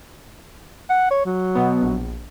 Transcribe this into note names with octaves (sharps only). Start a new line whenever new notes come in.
F#5
C#5
F#3
B2 B3
A#1